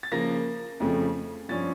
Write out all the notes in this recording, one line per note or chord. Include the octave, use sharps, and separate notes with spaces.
A6
C#3 F3 A#3 A#6
F2 C#3 F3 A3
G2 F3 C#4 A6